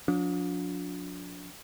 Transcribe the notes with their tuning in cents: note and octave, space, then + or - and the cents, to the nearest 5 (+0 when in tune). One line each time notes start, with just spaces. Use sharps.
F3 +45 D4 -25